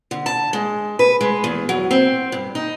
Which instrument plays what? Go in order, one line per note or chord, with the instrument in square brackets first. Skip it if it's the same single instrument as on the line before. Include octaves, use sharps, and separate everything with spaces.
[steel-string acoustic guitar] D3
A5
G#3
B4
G#3
E2
F#3
C4
G2
D#4